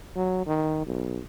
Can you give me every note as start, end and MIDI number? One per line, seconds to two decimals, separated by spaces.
0.16 0.46 54
0.46 0.84 51
0.86 1.20 35